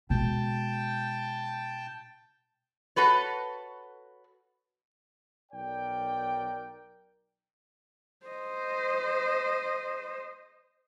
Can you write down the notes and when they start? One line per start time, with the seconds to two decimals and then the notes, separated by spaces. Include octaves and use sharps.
0.10 B2 G#3 G5 A5
2.96 F#4 A4 B4 C#5
5.52 B1 A#4 D5 G5
8.26 C5 D#5